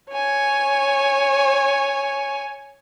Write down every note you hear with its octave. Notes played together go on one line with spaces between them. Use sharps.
C#5 G#5